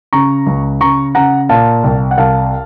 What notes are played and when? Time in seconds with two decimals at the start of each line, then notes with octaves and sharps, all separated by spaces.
0.13 C#3 A#5 C#6
0.46 C#2
0.81 C#3 A#5 C#6
1.15 C#3 F#5 A#5
1.49 A#2 F5 A5
1.84 C2
2.11 F#5
2.18 C2 F5 A5